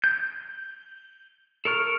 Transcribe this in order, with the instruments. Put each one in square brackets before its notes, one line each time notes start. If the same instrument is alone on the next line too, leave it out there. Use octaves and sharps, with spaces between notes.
[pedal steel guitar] G6
A4 A#4 C#6 F6